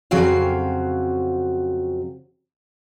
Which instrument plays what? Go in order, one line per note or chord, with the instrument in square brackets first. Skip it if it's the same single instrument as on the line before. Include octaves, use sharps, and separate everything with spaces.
[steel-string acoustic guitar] F2 C#3 F#3 C4 F#4 F5